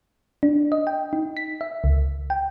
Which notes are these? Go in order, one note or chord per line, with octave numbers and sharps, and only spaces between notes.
D4
D#5
G5
D#4
B6
E5
C#2
G5